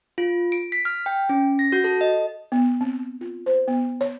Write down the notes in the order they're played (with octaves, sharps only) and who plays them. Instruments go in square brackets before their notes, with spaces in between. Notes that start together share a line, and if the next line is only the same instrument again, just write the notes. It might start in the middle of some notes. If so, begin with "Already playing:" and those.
[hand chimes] F4
D7
B6
F6
G5
C#4
A#6
F#4
A4
D#5
[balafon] B3
C4
F4
C5
B3
C#5